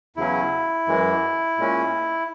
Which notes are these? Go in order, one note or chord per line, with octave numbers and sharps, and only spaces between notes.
E2 C#3 F#3 C#4 E4
F#2 E3 G#3
A#2 G#3 C#4